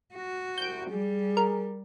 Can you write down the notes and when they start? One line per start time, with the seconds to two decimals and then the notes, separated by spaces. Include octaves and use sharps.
0.15 F#4
0.58 C2 G6 D7
0.90 G3 G#4
1.37 A#4